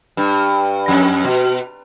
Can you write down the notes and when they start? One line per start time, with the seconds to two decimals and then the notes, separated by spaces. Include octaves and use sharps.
0.17 G2
0.88 F2
1.24 B2